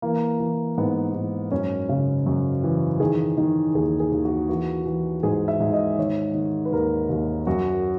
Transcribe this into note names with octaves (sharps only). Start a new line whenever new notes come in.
E3 A#3
E3
G#2 B3
G#2
F#2 C#4
C#3
F#2
E3
D#3 G#4
D#3
D#2 G#4
G#4
D#2
F#4
E3 F#4
E3
G#2 G#4
E5
G#2
D#5
D#3 C#5
D#3
B4
D#2 A#4
D#2
F#2 F#4